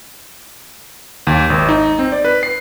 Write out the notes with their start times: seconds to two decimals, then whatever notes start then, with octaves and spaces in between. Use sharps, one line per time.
1.27 D#2
1.50 G#1
1.69 D#4
1.99 C4
2.12 D5
2.25 B4
2.43 C7